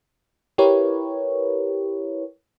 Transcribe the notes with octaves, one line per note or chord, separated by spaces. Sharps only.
E4 G4 A#4 B4 C#5